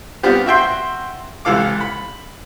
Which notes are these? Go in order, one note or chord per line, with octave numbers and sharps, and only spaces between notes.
G3 B3 C4 D4 F4 G4
F#4 E5 G5 C6
C#2 C3 E3 A4 F5 D6
B5